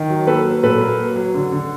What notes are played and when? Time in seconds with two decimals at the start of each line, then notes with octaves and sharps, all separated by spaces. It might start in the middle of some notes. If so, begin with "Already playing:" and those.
Already playing: D#3
0.10 F#3
0.27 A#3 A4 B4
0.45 F#3
0.63 A#2 A4 B4
0.81 A#3
0.99 F#3
1.16 F#3
1.34 D3
1.52 D3